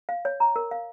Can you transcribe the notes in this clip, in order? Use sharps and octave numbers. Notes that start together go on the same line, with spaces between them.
F5
C#5
A#5
A#4
F5